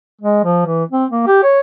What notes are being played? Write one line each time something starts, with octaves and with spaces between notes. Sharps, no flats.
G#3
F3
E3
C4
A#3
G4
C#5